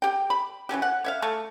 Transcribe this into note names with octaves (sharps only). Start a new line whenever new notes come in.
G4 G5
B5
E3 F#3 C#4 G4
F#5
C#5 E5 F5
A3 A5 C#6